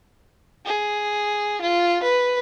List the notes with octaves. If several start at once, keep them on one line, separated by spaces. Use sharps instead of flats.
G#4
F4
B4